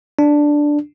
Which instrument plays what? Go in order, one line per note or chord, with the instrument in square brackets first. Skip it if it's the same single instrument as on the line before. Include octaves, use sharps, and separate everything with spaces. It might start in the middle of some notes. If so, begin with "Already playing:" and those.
[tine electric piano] D4